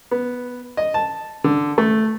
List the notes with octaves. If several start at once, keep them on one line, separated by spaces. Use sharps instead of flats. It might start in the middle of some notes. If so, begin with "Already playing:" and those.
B3
D#5
A5
D3
A3